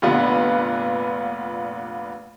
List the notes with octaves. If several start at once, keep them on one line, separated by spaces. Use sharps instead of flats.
F1 A#2 D3 B3 F4 B4